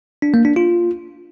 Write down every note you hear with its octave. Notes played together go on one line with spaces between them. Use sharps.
D4
A#3
D4
F4